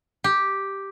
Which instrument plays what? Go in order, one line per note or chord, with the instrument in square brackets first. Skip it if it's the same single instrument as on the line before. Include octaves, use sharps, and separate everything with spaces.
[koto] G4